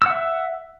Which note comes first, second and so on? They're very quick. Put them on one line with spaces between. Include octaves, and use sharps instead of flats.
E6 F#5 E5